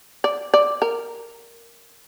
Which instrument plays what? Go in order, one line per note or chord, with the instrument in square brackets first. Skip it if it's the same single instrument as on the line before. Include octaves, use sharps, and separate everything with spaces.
[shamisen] D5
D5
A#4